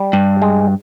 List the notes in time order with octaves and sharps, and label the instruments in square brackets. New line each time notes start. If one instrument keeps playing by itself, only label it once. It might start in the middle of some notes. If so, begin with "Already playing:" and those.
Already playing: [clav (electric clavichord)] G3
[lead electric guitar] G2
[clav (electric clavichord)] G#3